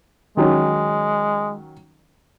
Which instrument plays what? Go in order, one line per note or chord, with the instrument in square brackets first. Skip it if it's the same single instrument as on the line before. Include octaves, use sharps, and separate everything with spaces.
[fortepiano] D#3 F#3 C#4 [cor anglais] G#3